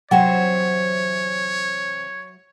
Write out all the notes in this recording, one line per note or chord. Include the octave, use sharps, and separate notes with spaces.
C3 E3 F#3 C5 C#5 E5 F#5 G5